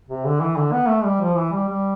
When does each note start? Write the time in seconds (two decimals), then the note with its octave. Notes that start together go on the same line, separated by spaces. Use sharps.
0.09 C3
0.25 D3
0.41 E3
0.56 D3
0.72 B3
0.88 A3
1.04 G3
1.21 F3
1.37 E3
1.52 G3
1.68 G3